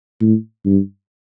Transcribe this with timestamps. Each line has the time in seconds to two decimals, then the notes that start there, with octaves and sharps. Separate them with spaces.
0.21 A2
0.65 G2